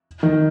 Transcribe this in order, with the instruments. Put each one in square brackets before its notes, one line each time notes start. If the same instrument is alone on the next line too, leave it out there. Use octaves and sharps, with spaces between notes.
[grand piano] D#3